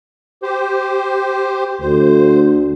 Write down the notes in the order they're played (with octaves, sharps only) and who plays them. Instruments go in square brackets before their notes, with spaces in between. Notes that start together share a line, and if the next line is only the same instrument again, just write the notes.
[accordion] G4 C5
[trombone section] D2 [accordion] C5